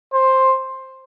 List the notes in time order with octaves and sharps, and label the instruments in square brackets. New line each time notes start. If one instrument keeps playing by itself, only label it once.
[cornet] C5